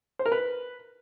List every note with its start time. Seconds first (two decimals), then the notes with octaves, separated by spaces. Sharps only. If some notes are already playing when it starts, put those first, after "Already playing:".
0.19 C5
0.26 A#4
0.32 B4